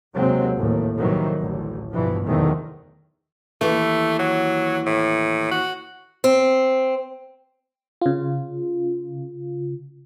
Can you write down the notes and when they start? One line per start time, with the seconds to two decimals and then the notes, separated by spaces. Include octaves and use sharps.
0.16 D#2 C3 F#3 G#3 C4
0.57 A1 D#2 A2
0.98 F2 A2 C3 D#3 E3 F#3
1.38 A1 D2
1.93 G2 B2 E3 F3
2.24 F1 B1 E2 D#3 A3 C4
3.61 D#2 E3 A3
4.19 F#3
4.86 A2
5.51 F#4
6.24 C4
8.02 C#3 F4